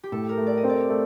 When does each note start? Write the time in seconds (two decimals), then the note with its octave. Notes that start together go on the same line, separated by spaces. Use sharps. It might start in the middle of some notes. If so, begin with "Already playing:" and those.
0.03 G4
0.12 A2 A4
0.29 A#4
0.38 A3
0.47 D5
0.57 D#5
0.64 C4
0.69 D5
0.89 A3